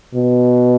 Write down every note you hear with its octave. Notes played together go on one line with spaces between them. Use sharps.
B2